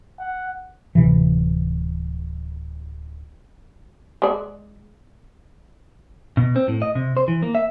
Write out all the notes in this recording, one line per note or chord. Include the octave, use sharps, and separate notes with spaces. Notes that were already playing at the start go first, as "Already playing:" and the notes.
F#5
D1 C3 E3
G#3 D5
B2
C4
A2
D#5
C3
C5
E3
A#3
E5